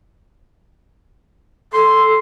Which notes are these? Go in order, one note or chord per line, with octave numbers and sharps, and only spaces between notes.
A4 C6